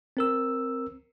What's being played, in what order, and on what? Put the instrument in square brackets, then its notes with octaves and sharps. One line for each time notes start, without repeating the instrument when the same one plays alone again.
[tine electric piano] C4 A#4 E6